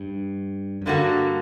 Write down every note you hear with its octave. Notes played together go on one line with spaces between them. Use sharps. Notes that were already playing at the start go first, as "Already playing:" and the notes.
Already playing: G2
F#2
G2 D3 G3 A#3 F#4 A4